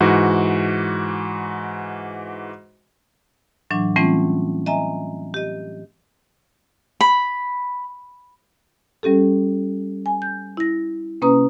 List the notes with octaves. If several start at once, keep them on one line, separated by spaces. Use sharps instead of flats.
G#2 E3 F#4
A2 E3 F#3 D4
E3 G3 A3 C4 C#4 F4
D#5 E5 G#5 A#5
G4 D#5
B5
G3 C#4 G4 A4
G#5
G6
E4 A#6
C3 A#3 C#4 B4 A#5 D#6